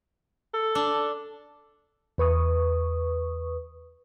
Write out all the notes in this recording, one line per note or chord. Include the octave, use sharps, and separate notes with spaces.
A4
D4
E2 B4 C#6 D#6